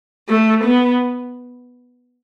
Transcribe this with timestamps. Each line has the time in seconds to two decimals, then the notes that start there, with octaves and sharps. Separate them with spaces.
0.29 A3
0.64 B3